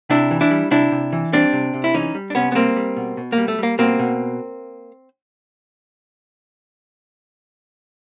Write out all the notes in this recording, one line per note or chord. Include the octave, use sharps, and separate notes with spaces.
C3 D4 E4
E3
D4 E4
G3
C3 D4 E4
C3
E3
G3 C4 D4
C3
C3
E4
E3 C#4 D#4
G3
D4
C3 B3 C#4
B3
G3 A#3 C4
G3
B2
B2
A#3
G3
A3
G3 A#3
B2 A#3 C4
B2